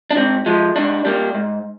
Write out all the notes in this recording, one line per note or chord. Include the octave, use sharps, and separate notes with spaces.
D4
G#2 C4
F3 G#3
G#2 D4
G3 A#3
G#2